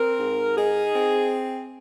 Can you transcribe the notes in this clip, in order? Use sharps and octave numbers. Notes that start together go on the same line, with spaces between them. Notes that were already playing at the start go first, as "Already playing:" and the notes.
Already playing: C4 A#4
G#2
D#4 G#4
C4